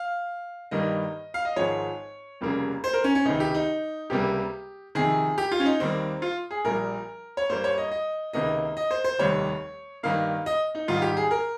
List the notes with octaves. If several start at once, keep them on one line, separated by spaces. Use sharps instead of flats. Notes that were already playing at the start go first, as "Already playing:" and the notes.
Already playing: F5
G2 D#3 G3 A#3 D#5
F5
D#5
G#1 G#2 F3 G#3 C#5
F1 F2 C#3 G3 A#3
C5
A#4
C#4
C#4
C#2 C3 D#3 D#4
G4
D#4
C#2 C3 G3 A#3 G4
F2 C3 D#3 G#4
G4
F4
C#4
D#4
D#2 D#3 G3 A#3 C4
F4
G#4
A#1 A#2 G3 A#4
C#5
G2 G3 A#3 C5
C#5
D#5
D#5
C#2 C3 D#3 A#3 D#5
D#5
C5
C5
F1 D#2 D#3 G3 C#5
G2 D#3 A#3 F5
D#5
D#4
G#1 G#2 D#3 G3 F4
G4
G#4
A#4